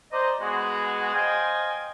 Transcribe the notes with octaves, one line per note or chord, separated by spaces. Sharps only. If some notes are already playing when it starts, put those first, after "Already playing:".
C5 D5 D#5 A#5
G#3 B3 F#4 G#4
C5 D#5 F5 G5 G#5